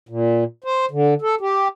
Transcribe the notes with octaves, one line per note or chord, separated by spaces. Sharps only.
A#2
C5
D3
A4
G4